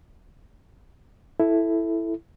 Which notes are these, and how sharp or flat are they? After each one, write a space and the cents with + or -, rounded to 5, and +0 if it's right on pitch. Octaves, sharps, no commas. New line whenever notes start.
E4 +5 A4 +0